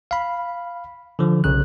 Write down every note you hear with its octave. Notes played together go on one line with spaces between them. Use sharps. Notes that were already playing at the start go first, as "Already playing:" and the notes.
F5 B5
D3 F3
B1 C#3 F#6